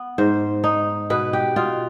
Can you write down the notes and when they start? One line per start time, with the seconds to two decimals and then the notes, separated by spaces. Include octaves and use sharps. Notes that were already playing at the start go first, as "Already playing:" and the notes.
Already playing: B3
0.18 G#2 C5
0.64 D#4
1.10 B2 B4
1.33 G4
1.56 B2 F4